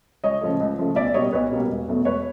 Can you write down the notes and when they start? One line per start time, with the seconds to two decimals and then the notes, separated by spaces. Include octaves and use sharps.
0.24 C#2 C#5 D#5
0.41 C#3 F3 A3
0.60 C#2
0.78 C#3 F3 A3
0.96 B1 D5 E5
1.14 B2 G3 A#3 C#5 D#5
1.33 B1 B4 C#5
1.52 B2 G3 A#3
1.70 E1
1.88 E2 B2 F#3 A3
2.05 E1 B4 C#5